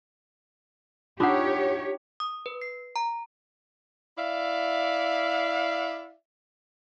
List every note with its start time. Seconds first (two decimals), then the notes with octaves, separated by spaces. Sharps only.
1.20 D4 D#4 F4 G4 C#5 E5 F#5
2.20 D#6
2.46 B4
2.62 C7
2.96 A#5
4.16 E4 D5 E5 F5